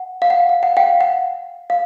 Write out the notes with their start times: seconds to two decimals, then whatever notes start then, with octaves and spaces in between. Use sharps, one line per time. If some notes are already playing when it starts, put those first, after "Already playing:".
Already playing: F#5
0.22 F5
0.30 F#5
0.49 F5
0.63 F#5
0.77 F5 G5
1.01 F#5
1.70 F5